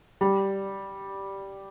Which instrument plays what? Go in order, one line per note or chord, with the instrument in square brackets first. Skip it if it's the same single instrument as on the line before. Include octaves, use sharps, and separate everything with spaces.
[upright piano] G3